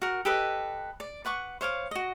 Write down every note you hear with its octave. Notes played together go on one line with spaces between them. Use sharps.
F#4 A#4
G4 A4 B4 D#5
D5
B4 F#5 C#6 D6
C5 C#5 F5 D6
F#4 D#5